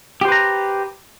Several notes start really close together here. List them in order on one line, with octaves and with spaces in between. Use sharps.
G4 C5 B4 A#5